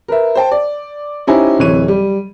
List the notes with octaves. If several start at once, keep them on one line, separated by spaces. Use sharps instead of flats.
A#4 B4 E5
C5 G5 A5
D5
C#4 D#4 E4 G4 C5 G#5
D1 C3 E3 C#5 D#7
G3